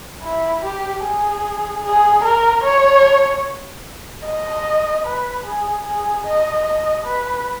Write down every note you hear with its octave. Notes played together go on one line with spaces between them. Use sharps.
E4
G4
G#4
G#4
A#4
C#5
D#5
B4
G#4
G#4
D#5
D#5
B4